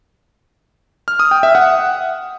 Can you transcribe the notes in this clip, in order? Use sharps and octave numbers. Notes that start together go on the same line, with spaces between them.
F6
D#6
G5
E5
F#5